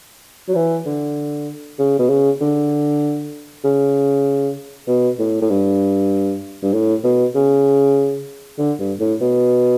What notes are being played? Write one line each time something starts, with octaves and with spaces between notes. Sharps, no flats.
F#3
E3
D3
C#3
B2
C#3
D3
C#3
B2
A2
A2
G2
G2
A2
B2
C#3
D3
G2
A2
B2